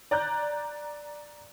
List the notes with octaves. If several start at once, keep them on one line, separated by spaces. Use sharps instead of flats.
D5 A#5 F#6 G6